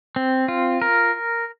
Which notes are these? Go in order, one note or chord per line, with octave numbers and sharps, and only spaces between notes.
C4
F4
A#4